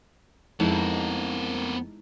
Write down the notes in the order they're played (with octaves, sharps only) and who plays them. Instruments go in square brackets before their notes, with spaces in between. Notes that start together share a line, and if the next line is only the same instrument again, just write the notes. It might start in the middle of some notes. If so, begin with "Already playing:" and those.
[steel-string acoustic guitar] F2 [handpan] G#3 D#4 E4 [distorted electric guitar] B3 A#4